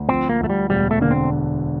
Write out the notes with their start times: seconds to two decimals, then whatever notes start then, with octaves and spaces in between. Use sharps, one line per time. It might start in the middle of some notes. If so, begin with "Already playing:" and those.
Already playing: D2
0.09 F3 C4
0.29 A#3
0.40 D2 A3
0.50 G3
0.70 E1 G3
0.91 A3
1.01 D3 A#3
1.11 C4